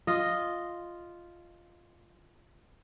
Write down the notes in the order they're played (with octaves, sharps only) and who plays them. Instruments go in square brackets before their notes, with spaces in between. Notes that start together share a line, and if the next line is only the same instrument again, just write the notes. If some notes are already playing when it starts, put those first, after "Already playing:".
[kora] F4 D#5